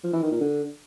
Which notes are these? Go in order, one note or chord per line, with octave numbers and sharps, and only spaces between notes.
F3
E3
D#3
A#2
D3